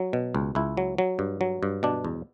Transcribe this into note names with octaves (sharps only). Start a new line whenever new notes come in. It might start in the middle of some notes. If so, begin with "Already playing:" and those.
Already playing: F#3
B2
C#2
C#2 E4
F#3
F#3
G2
F#3
G2
B2 D4
E2